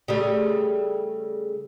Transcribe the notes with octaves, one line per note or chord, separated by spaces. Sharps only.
C#3 G3 A3